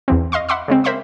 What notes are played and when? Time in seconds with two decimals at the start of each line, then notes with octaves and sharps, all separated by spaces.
0.08 E2 E3 C4
0.32 D#5 F5 C6 C#6
0.49 E5 F#5 B5 C6 D6 E6
0.68 C#3 G#3 C4
0.84 A#4 C5 E5 B5 C6 D6